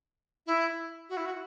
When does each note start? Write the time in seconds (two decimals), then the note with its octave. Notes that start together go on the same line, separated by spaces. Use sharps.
0.46 E4
1.09 F#4
1.17 E4
1.25 F#4